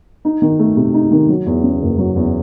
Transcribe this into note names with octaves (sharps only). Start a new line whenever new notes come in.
D#4
D#3
A3
C3
D#4
D#3
F#3
E2
C#3
F#1
F#3
E2